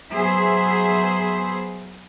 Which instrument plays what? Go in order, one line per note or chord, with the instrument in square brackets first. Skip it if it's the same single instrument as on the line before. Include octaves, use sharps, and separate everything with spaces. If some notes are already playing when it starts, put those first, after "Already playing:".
[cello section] F#3 B3 G#4 C5 E5